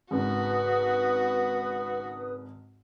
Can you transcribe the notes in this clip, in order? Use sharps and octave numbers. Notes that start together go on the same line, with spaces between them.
G#1 G#2 C#3 F#4 B4 D#6